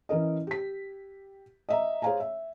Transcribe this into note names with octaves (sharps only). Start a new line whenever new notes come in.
E3 C#4 A#4 D#5
G4 B6
D#5 E5 A#5
G#4 C5 C#5 F5 G#5 A#5
E5